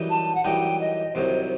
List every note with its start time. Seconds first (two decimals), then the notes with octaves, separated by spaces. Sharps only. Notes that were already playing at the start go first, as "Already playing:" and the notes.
Already playing: F#2 E3 G3 D#4
0.09 A5
0.34 F#5
0.44 F#2 E3 G3 D#4 G5
0.80 D#5
1.15 C2 C3 D#3 F#3 C5